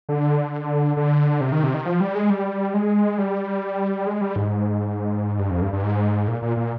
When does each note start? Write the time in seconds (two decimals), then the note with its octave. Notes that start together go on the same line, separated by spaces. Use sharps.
0.09 D3
0.97 D3
1.41 C3
1.52 D#3
1.64 C3
1.74 D#3
1.85 F3
2.01 G3
2.15 G#3
2.30 G3
2.74 G#3
3.18 G3
4.07 G#3
4.21 G3
4.36 G#2
5.39 G2
5.50 F2
5.62 G2
5.73 G2
5.84 G#2
6.28 A#2
6.42 A#2
6.57 A#2